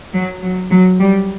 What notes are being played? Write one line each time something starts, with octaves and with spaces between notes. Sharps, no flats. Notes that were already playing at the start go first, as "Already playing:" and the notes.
F#3
F#3
F#3
G3